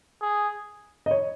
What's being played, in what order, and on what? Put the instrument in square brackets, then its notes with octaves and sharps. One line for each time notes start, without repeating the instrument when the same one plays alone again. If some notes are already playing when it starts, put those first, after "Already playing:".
[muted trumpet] G#4
[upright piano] D#5
C#5